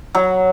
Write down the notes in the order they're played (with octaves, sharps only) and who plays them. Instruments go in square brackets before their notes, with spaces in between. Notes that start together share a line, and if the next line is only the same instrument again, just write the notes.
[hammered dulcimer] F#3